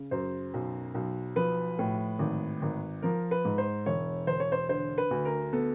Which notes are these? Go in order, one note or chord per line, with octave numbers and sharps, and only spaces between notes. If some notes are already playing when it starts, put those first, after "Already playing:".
Already playing: C#3
F#2 C5
B1
B1
F3 B4
A2
G#1
G#1
F3 A#4
B4
G#2
C5
E1 C#5
E1 C5
C#5
C5
D3 C5
B4
D2
A#4
B3 A4